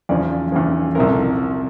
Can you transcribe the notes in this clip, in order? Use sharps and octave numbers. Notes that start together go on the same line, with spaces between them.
E2 C#3 F3 D5
E2 C#3 F3
C2 C3 F3 A#4
A4